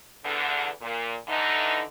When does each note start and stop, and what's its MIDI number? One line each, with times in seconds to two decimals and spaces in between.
0.25 0.68 40
0.25 0.68 50
0.82 1.15 46
1.28 1.82 50
1.28 1.82 52
1.28 1.82 63